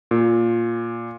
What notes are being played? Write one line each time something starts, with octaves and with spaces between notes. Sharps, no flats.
A#2